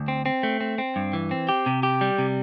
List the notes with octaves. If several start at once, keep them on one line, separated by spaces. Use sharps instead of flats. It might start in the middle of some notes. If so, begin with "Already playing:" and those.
Already playing: D2
C4
C4
A3
C4
C4
G2
E3
C4
G4
C3
G4
G3
C3